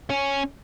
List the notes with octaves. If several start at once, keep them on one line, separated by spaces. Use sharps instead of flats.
C#4